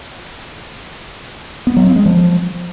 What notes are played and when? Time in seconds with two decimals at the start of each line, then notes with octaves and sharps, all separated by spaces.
1.67 B3
1.77 F#3
1.86 C4
1.96 G#3
2.06 F3